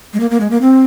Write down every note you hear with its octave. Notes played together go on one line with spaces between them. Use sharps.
G#3
A#3
A#3
G#3
A#3
C4